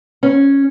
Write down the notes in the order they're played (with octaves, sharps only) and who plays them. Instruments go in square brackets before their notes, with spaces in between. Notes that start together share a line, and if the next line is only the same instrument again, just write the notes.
[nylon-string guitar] C#4